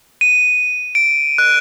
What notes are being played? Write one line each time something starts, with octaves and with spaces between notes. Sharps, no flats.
D#7
D7
F#6